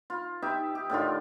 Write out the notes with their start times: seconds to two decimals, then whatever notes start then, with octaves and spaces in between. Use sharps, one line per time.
0.10 F4
0.42 D#4 G4 E5
0.75 G4
0.90 A2 D3 D#3 F4